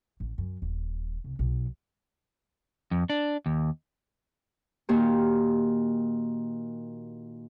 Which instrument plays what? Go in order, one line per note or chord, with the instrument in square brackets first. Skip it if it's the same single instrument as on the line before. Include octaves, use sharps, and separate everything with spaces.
[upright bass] A1
F#2
D#1
C2
B1
[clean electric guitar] F2
D4
D#2
[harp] A#2 D#3 A#3 F#4 G4